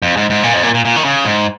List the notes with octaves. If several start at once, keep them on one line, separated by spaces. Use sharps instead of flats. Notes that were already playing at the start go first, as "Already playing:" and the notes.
F2
G#2
G#2
A#2
F2
A#2
A#2
A#2
D#3
C#3
G#2